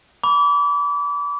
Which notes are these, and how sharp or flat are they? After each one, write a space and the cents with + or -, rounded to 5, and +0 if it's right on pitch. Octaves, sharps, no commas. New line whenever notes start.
B5 +0 D6 -35